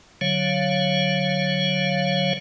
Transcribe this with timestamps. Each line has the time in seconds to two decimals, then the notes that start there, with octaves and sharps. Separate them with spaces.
0.21 D3 F#3 C#5 F5